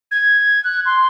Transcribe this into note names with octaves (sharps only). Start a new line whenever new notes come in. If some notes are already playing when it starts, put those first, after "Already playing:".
G#6
F#6
C6